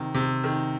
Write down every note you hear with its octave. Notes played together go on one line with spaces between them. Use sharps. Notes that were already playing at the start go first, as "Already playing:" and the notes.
Already playing: C3 D#3
C3
D#3